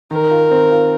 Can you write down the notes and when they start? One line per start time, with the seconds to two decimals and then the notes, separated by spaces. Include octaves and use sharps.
0.11 D#3 A#4
0.31 F4
0.51 C4
0.72 F4